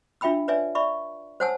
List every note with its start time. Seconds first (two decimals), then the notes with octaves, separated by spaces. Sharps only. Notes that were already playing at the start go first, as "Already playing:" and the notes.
0.21 D4 F4 E5 G5 B5 E6
0.48 B4 C#5 D5 E5 G#5
0.75 D5 E5 B5 C#6
1.40 C5 C#5 F#5 G#5 A5 E6